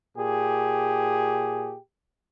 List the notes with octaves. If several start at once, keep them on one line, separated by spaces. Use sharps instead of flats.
A#2 G4 G#4